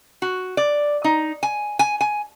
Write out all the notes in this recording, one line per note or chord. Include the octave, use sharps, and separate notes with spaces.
F#4
D5
D#4
G#5
G#5
G#5